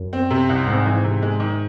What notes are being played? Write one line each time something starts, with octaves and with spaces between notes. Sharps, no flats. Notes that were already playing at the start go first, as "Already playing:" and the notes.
Already playing: F#2
C4
C3
C2
G#2 C4
E3
C3
G#3
D#3